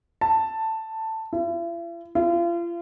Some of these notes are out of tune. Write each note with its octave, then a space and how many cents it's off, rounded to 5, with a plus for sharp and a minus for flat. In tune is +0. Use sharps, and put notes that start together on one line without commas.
A5 +10
E4 +45
F4 -35